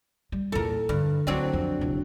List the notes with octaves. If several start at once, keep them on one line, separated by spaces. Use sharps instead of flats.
G3
E2 A#2 A4 A#4
G2 D3
D2 E3 F#3 C4 D4
F2
E1 C#2